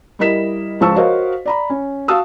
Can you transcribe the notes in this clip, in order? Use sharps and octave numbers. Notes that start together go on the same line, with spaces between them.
G3 E4 A#4 D#5 B6 E7
C#2 F3 C5 A5 C#6 E6
F#4 A#4 C5 C#5 D#5 F5
D5 A#5 B5
C#4
F#4 F5 A5 D#6 E6